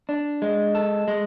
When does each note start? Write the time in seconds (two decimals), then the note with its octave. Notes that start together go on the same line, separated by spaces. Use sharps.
0.09 D4
0.42 G#3
0.75 A4
1.08 G#3